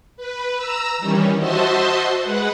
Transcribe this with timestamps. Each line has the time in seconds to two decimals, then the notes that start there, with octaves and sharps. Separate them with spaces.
0.17 B4
0.57 A#5 E6
0.98 D#3 E3 G3 C#4
1.38 F#4 C5 D#5 E5 A5 C6
2.20 G#3 B4 F#5